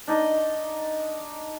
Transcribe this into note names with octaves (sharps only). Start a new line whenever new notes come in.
D4 D#4 D#5